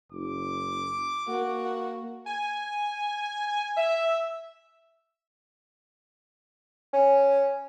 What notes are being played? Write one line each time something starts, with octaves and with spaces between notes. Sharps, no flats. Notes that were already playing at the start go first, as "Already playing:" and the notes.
F#1 D6
A#3 F#4
G#5
E5
C#4